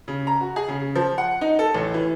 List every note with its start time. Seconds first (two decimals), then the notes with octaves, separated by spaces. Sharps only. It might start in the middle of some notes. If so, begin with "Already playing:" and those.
0.08 C#3
0.27 A#5
0.41 F#4
0.56 G#4
0.68 C#3
0.95 F3
1.18 F#5
1.41 D#4
1.59 A4
1.74 A1
1.94 E3